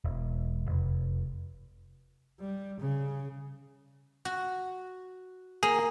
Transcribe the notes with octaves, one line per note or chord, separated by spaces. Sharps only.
E1
F1
G3
C#3
F#4
A#3 G#4